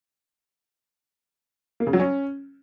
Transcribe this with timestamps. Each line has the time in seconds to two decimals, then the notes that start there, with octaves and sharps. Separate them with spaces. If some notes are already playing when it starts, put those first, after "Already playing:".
1.80 A#3
1.87 C#3
1.93 F#3
2.00 C#4